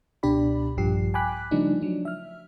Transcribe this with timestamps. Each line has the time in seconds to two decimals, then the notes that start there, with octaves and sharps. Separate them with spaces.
0.23 C#2 B2 D4 G4 D5 B5
0.77 A#1 G2 F3 G4 C7
1.14 G5 G#5 B5 D6 F#6 B6
1.51 C#3 F3 G3 A3 D4 D#4
1.81 F3 F#3 D4
2.05 E5 F6